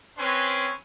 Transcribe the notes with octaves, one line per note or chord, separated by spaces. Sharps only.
C4 C#4 B4 G#5 C6